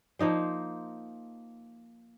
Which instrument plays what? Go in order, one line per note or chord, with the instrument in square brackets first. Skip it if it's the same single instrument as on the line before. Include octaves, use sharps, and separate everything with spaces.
[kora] F3 A#3 D#4 C5